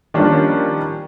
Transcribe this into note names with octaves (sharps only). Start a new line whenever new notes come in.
D#3 F3 G3 A#3 C#4 D4